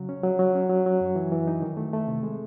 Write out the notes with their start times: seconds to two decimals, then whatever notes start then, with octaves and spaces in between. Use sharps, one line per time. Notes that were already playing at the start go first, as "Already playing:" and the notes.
Already playing: C#3 F#3
0.09 C#4
0.24 F#3
0.39 F#3
0.55 C#4
0.69 F#3
0.86 F#3
1.01 F#2
1.16 E3
1.32 E3
1.47 D#4
1.62 D#3
1.77 A3
1.93 A3
2.08 C3
2.23 G#3